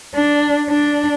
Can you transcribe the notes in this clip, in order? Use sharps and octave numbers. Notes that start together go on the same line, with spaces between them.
D4
D4